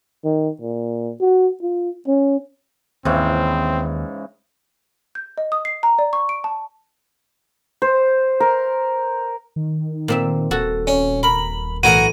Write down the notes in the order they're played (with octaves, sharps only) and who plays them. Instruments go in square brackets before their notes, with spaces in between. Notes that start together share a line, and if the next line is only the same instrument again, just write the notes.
[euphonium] D#3
A#2
F#4
F4
C#4
[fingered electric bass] D#2 [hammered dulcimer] G#2 C#3 E3 [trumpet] C4
[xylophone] G6
D#5
D#6
C7
A#5
D5
C#6
D7
A5
[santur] C5
A#4
[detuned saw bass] D#3
[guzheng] A#2 C4 E5
[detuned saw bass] D#1 [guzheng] F#4 A4
[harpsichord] C#4
[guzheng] A#4 [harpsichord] B5
[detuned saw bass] B1 [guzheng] A2 E3 [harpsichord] F#4 A#4 F#5 [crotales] D#7